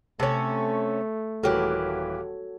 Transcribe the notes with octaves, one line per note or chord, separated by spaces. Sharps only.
C3 A3 C#4 A4 C#5
D#1 E3 A#3 F#4 G4 A4 B4 C#5